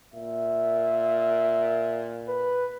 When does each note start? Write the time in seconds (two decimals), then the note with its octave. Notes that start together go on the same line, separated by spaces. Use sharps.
0.14 A#2 E5
2.28 B4